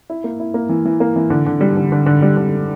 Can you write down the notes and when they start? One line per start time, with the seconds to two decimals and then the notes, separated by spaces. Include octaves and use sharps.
0.10 E4
0.24 A#3
0.40 E4
0.54 A#3
0.69 E3
0.85 E3
1.00 A#3
1.16 E3
1.30 D3
1.46 D3
1.61 G3
1.77 D3
1.92 D3
2.06 D3
2.22 G3
2.37 D3